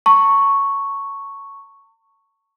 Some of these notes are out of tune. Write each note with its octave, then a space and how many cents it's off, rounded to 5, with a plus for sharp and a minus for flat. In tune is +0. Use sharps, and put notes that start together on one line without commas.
A5 +45 C#6 +0